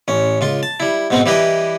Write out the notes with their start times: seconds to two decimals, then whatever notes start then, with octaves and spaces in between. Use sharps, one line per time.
0.08 A1 C#4
0.41 C#2 F4 C6
0.63 A5
0.80 G3 E4
1.10 G#2 B2 B3 C4 D#4
1.26 E3 G3 E4 G4 B4 D#5